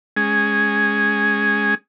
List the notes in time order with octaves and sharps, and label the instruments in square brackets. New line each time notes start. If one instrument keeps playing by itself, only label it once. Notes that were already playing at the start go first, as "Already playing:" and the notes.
[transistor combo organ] G#3 C#4 G#4